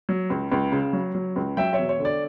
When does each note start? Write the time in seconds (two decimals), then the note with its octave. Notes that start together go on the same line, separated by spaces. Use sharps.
0.09 F#3
0.30 C#2
0.51 C#2
0.72 C#3
0.93 F#3
1.15 F#3
1.36 C#2
1.57 F#3 E5 G5
1.73 C#5 E5
1.79 E1
1.89 C#5
1.99 D3
2.05 D5